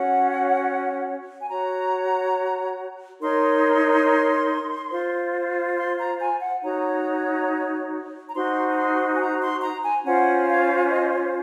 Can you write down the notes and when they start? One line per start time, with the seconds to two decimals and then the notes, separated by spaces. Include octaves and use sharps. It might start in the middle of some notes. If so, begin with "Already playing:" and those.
Already playing: C#4 F#4 C#5 F#5
1.40 G#5
1.48 F#4 C#5 A#5
3.20 D#4 A#4 C#5 C6
4.91 F4 C5
5.77 C6
5.98 A#5
6.20 G#5
6.41 F#5
6.62 D#4 F#4 C#5 A#5
8.28 A#5
8.33 D#4 F#4 C5 C6
8.72 A#5
8.76 C6
9.14 G#5
9.19 A#5
9.41 C6
9.62 A#5
9.84 G#5
10.05 C#4 F4 C5 F#5
10.47 F5
10.90 D#5
11.12 C#5